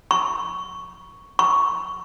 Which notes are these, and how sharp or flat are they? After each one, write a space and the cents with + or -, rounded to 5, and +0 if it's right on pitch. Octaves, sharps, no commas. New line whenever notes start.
C#6 +5
C#6 +10